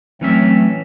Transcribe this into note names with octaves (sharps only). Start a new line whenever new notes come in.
E3 F#3 A3 C4 C#4 E5